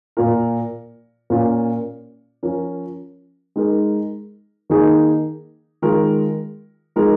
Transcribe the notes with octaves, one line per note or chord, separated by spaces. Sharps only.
A#2 A#3 F4 A#4
A#2 A#3 C#4 F4
F3 C#4 A#4
G#3 D#4 A#4
D#3 A#3 D#4 G#4
D#3 G#3 F4 A#4
F3 G#3 D#4 A#4